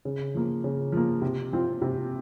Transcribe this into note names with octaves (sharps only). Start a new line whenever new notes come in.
C#3
F3 A#3
C#3
F3 A#3
C3
F3 C4 F4
C3